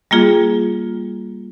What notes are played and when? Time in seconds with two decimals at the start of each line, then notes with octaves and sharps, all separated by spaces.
0.11 G3 A#3 F4 G#4